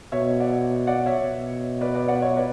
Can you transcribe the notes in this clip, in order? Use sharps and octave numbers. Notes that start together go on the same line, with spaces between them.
B2 C#5 E5
D5 F#5
D5 F#5
C#5 E5
B2
B4 D5
B4 D5
D5 F#5
C#5 E5
B4 D5